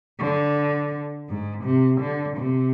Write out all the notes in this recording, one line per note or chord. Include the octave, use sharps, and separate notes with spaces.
D3
G#2
C3
D3
C3